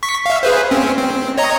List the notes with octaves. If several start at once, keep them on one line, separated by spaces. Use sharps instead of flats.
C#6 B6
E5 F5
G#4 B4 C5
C4 C#4
C4
C#5 D#5 A#5